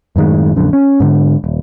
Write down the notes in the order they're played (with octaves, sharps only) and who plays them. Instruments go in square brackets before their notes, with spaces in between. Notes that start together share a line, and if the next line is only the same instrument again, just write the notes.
[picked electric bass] F#2 A2 D#3 G#3
A#1 F#2 D3
C#4
G#2 D3
D#1